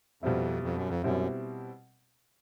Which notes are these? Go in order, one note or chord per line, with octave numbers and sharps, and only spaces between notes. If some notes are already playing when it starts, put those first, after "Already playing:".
F2 B2 G3 C4 E4
F2
F#2
F2
F#2 B2 G3 C4 E4